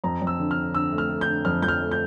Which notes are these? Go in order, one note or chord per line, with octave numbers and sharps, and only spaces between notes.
F2 A#5
F2
E6
D3
F6
D3
D3 E6
A3
F6
A3
G6
D3
F2 F6
F2 G6
F6
A3
G6